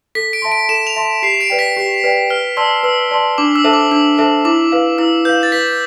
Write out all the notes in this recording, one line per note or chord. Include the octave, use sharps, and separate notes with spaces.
A4 B6
D7
E5 A5 C6
D7
A4 E7
F7
E5 A5 C6
G4 C7
D7
B4 D5 G5
B6
G4
B4 D5 G5
B4 F6
D5 A5 C6 E6
B4 E6
D5 A5 C6
D4 D6
E6
A4 C5 E5 A5
D6
D4 E6
A4 C5 E5 A5
E4 D6
B4 F5
E4 E6
B4 F5 G6
A6
B4 B6